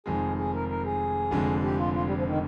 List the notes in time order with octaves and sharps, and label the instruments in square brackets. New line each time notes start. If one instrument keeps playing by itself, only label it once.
[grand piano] F1 F2 D#3 G#3 [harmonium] G#4
[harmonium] G#4
A#4
A#4
G#4
[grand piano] F1 F2 D3 G#3
[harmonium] G4
F4
F4
G3
F3
D#3